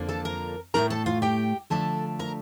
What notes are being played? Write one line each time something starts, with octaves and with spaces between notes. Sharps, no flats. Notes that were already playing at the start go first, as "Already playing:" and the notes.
Already playing: F2 D3 F3 A#3 D4
A4 A5
A#4 A#5
A2 A3 D4 A#4 A#5
A4 A5
F4 F5
G4 G5
D3 F3 A3 D4 A4 A5
A#4 A#5